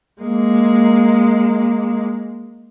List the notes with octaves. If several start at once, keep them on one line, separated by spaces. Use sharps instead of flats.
G#3 A#3